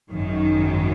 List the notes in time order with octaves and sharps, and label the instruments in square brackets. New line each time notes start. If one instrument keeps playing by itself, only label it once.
[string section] G#1 F#2 D#3 F#3